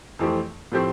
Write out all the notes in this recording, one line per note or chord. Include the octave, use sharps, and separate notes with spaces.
F2 E3 A3 C4 G4
A2 F3 A3 C4 G4